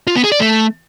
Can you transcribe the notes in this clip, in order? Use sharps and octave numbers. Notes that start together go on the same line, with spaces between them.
F4
B3
G#4
D5
A3